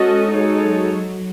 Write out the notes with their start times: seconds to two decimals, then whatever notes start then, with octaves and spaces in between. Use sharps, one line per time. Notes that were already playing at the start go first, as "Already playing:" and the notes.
Already playing: G#3 C#4 F#4 A4 D#5
0.33 G#3 D#4 F#4 A4 C#5
0.62 F#3